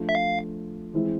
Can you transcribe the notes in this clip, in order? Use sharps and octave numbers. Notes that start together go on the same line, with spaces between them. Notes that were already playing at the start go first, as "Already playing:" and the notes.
Already playing: F3 A3 D4 F4
E5
F5
E3 G#3 C4 E4